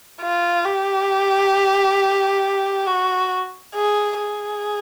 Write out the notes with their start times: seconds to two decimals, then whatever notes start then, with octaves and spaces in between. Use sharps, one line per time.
0.21 F4
0.65 G4
2.87 F#4
3.75 G#4
4.20 G#4